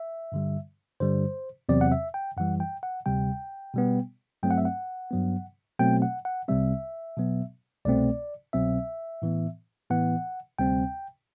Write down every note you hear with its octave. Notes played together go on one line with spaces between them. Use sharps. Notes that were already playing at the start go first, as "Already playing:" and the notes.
Already playing: E5
G2 D3 G3
G2 D3 G3 C5
E2 C3 F#3 C4 D5
F#5
E5
G5
F#2 E3 G3 F#5
G5
F#5
D2 C3 G3 G5
B2 G3 B3
G2 F#3 A3 C4 G5
F#5
E5
F#5
G2 F#3 B3
B2 F#3 A3 C4 G5
F#5
F#5
C2 C3 G3 C4 E5
B2 F#3 B3
C2 B2 A3 C4 D5
C2 B2 F#3 C4 E5
A2 E3 B3
A2 E3 B3 F#5
D2 C3 G3 C4 G5